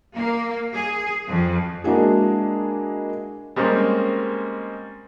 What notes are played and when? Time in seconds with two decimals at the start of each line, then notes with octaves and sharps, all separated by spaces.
0.14 A#3
0.74 G#4
1.26 F2
1.84 G#3 A#3 D4 E4 F#4 G#4
3.56 G3 G#3 A#3 C4 C#4